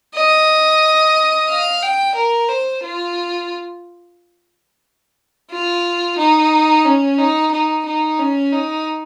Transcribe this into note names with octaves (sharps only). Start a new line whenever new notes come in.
D#5
F5
G5
A#4
C5
F4
F4
D#4
C#4
D#4
D#4
D#4
C#4
D#4